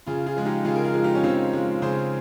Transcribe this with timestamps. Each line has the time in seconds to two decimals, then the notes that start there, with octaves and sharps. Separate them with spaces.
0.07 C#3 F4 G#4
0.26 F4 G#4
0.37 F3 G#3
0.45 D#4 G4
0.65 C#3 F4 G#4
0.76 A#4
0.84 F4 G#4
0.94 F3 G#3
1.04 D#4 G4
1.15 C#4
1.23 C#3 C4 D#4
1.52 F3 G#3
1.82 C#3 G#4 C5